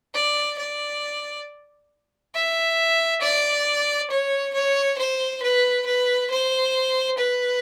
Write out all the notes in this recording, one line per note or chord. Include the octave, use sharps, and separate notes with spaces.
D5
D5
E5
D5
C#5
C#5
C5
B4
B4
C5
B4